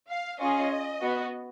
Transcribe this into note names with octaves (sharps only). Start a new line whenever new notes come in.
F5
C#4 F4 G#4 D#5
B3 F#4